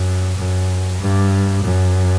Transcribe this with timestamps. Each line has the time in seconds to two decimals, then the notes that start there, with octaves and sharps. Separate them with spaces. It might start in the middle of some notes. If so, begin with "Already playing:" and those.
Already playing: F#2
0.37 F#2
1.00 G2
1.63 F#2